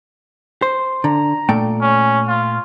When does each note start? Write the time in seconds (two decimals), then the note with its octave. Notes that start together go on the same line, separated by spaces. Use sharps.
0.62 C5
1.04 D3 A#5
1.49 A#2 A3 G5
1.82 C#4
2.27 F4